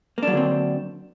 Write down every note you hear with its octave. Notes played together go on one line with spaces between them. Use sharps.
D3 F#3 A#3 C4 D4